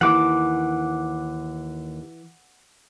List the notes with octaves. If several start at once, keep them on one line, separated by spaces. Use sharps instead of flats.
D#2 E3 F#5 D6